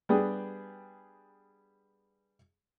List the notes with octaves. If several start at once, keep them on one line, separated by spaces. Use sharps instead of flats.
G3 B3 D4 G#4 G5 D#6